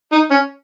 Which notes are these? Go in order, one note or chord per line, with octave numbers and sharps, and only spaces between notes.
D#4
C#4